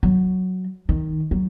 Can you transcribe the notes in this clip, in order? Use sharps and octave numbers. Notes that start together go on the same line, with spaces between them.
F#3
D#3
F#3